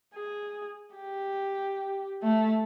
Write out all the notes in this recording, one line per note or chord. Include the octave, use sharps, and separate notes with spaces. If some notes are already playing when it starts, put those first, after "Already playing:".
G#4
G4
A3